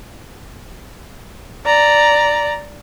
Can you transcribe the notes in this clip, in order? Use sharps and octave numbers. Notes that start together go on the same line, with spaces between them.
D5 A#5